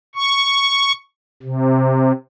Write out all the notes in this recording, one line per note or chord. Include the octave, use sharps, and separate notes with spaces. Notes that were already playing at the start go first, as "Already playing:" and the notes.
C#6
C3